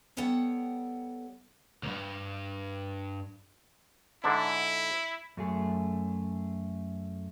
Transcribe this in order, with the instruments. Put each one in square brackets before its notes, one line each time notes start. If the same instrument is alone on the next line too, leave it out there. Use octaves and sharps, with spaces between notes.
[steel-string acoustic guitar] G3 B3 A4 C#5 F#5 G5
[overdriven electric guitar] C#2 G2
[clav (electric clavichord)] G#2 D3 D4 [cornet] E4
[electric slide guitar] F#2 A3 G#4